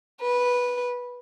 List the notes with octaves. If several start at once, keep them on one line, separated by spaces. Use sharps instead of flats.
B4